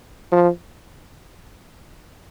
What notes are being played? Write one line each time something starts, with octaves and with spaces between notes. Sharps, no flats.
F3